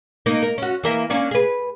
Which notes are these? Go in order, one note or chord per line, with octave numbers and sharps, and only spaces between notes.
A#3 D#4
A#4
C#4 F#4
E3 A#3 E5
A#3 C#4 D4
G#4 B4